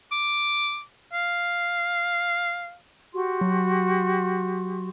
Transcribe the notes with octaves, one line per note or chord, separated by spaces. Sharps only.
D6
F5
F#4 G4 C6
F#3